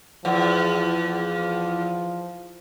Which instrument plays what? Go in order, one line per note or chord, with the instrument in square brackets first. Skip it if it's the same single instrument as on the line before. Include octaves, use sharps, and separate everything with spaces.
[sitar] E2 [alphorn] F3